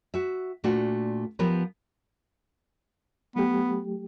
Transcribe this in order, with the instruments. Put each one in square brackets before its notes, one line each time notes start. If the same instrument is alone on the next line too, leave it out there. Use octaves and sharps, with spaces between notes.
[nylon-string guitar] F#4 E5
A#2 A3 D4 F4 F#4
F3 B3 G4 A#4 B4
[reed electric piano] F#3 A3 G4 [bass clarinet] B3